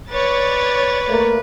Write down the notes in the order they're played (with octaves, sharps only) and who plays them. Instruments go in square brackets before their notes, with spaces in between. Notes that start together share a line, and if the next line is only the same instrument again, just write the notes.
[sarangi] B4 [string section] C#5 D5 A6
[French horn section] A3 A#3